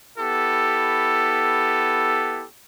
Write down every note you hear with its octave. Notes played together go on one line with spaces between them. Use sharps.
B3 E4 G4 A4